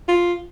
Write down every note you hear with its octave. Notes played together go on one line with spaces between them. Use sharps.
F4